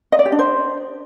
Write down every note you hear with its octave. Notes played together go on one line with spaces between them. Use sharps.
D#5
D5
G4
D4
C5